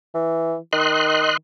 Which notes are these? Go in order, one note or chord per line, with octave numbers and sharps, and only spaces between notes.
E3
D#3 D#5 C6 F#6